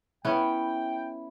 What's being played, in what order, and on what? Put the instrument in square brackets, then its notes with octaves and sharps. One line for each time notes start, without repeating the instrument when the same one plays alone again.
[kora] B3 C#4 [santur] E4 [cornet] G5